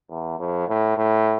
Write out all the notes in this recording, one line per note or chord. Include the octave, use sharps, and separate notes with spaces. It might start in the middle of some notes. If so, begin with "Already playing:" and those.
E2
F2
A2
A2